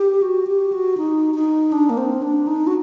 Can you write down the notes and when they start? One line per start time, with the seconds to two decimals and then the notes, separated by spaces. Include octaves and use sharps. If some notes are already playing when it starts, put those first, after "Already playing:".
Already playing: G4
0.22 F#4
0.47 G4
0.72 F#4
0.97 D#4
1.35 D#4
1.72 D4
1.90 A#3
1.97 C4
2.22 D4
2.47 D#4
2.67 F#4